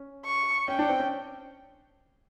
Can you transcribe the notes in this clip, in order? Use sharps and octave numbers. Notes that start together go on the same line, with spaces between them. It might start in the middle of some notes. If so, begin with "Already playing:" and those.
Already playing: C#4
C#6
C#4 G5
D4
C4
C#4